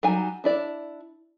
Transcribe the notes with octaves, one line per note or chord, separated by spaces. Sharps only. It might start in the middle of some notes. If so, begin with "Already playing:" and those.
F#3 G3 D#4 G#5
D4 E4 D5